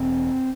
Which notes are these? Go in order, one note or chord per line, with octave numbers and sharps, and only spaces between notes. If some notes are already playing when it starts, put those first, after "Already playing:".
Already playing: E1 C4